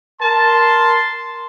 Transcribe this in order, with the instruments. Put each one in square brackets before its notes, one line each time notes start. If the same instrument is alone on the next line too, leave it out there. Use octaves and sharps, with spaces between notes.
[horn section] A#4 A5 [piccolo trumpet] C6